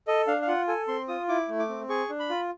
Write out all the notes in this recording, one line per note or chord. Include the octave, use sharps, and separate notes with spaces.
A4 D#5
D4 F5
F5
F4 F#5
A4 G#5
C4 C6
F4 D#6
E4 D6
A3
D6
C4
G#4 C#6
D4
B5
F4